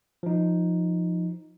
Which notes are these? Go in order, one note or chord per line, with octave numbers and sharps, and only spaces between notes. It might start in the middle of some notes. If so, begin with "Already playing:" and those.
F3 D#4